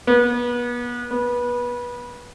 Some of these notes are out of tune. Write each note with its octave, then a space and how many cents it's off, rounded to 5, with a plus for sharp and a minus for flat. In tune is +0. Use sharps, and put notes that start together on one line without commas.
B3 -35
B3 -25